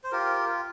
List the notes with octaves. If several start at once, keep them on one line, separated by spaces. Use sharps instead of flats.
C5
F4 G4 A#4